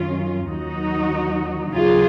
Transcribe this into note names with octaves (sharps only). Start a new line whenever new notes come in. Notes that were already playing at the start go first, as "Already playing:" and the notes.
Already playing: F#2 D#3 F#3 C#4 F4
D#2 D#3 F#3 D#4 F#4
D#2 C#3 F#3 F4 G#4